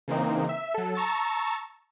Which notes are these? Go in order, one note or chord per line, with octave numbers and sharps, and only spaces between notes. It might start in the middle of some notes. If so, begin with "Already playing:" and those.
C#3 E3 A#3 C4 D#4
E5
F#3 A4
A5 A#5 C#6 E6 A6